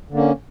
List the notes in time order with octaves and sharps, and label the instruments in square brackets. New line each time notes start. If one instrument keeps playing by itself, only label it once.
[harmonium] D3
A#3
C#4